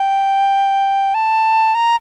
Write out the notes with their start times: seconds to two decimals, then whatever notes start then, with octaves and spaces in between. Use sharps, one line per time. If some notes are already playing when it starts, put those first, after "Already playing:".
Already playing: G5
1.14 A5
1.75 A#5